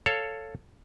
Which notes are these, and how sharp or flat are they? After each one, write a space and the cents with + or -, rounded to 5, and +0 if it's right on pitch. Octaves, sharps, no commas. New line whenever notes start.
A4 +10 C#5 +5 F5 +0